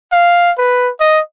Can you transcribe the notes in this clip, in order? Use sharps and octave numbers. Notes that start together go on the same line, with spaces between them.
F5
B4
D#5